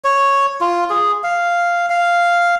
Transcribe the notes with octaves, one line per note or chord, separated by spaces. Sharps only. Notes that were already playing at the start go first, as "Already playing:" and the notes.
C#5
F4
G#4
F5
F5